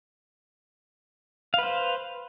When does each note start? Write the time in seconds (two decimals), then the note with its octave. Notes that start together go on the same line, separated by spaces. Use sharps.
1.54 F5
1.58 B4
1.63 C5